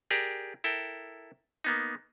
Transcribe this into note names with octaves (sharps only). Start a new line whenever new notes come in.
G4 G#4 A#4 D5
E4 A4 A#4 G5
A#3 B3 D#4